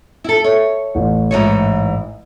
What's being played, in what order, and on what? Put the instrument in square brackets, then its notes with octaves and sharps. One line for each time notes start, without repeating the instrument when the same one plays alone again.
[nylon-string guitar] E4 A4
C#5
[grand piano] A1
[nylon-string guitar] G#2 E3 C#5